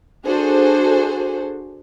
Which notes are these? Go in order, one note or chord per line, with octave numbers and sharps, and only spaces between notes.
D4 F#4 G#4 A4 C5